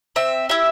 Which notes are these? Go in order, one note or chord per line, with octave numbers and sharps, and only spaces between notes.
C4 E5
E4 G4 E5